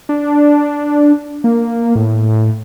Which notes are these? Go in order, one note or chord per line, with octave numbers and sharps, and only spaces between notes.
D4
A#3
A2